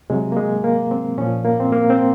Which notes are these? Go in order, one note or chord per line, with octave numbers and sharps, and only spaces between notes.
C3 F#3 G#3
A#3
G#3
A#3
C4
A#2 F3 C#4
A#3
C4
A#3
C4